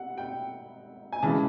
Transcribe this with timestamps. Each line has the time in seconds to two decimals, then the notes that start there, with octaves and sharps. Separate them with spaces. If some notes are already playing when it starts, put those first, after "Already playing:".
Already playing: G3 F#5
0.18 G5
1.12 G#5
1.23 C#3 E3 G#3 A5